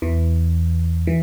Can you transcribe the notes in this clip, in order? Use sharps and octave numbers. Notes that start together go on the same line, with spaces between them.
E2 E3
E3